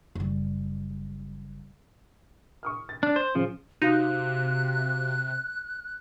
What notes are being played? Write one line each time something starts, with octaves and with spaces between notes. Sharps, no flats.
F#1 G3
C#6 D#6 F6
A6
D4
C5
C#3 F3
C3 D#4 F#4 F5 F#6